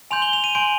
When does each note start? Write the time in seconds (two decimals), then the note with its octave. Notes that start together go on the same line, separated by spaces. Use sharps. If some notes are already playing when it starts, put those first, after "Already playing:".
0.11 G#5 C6 G6 F7
0.22 G7
0.33 F7
0.44 D#7
0.55 G#5 C6 G6 D7